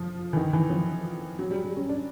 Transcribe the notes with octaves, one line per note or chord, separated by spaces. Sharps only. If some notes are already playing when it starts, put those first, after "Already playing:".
Already playing: F3
E3
D#3
E3
F3
F#3
G3
G3
C#4
D4